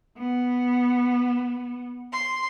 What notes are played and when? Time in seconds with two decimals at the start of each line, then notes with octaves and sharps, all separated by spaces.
0.19 B3
2.12 C6